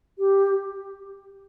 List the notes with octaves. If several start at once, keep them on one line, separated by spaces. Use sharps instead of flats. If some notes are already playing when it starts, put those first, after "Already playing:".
G4